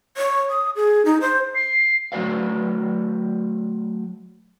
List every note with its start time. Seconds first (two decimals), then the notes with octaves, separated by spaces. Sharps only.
0.17 C#5
0.50 D#6
0.76 G#4
1.05 D#4
1.21 C5
1.55 C7
2.12 F#3 A3 F#4 C5 D5 F5